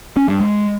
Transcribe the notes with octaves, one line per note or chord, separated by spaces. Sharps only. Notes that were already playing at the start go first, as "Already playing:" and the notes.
C#4
G2
G#3